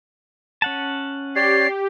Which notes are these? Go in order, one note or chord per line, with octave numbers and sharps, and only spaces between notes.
C#4 F#5 A5
G4 C#5 D5 C7